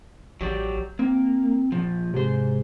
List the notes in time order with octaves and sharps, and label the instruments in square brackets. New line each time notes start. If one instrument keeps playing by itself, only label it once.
[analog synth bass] A1 [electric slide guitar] F#3 G4 D5
[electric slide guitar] A#3 [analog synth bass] C4
[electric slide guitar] A#2 F3
[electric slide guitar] G#2 C5 [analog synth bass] C3